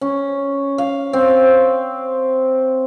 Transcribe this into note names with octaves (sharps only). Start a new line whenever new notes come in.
C#4
F5
C4